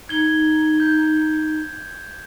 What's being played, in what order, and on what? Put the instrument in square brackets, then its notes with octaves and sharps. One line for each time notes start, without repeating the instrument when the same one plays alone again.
[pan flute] D#4 [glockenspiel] G#6 G7
[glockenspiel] G6